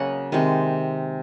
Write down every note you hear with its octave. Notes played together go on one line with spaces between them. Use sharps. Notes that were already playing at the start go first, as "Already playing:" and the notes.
Already playing: C#3 F#3 A#3 C#5 D#5 F#5
C3 D#3 G#3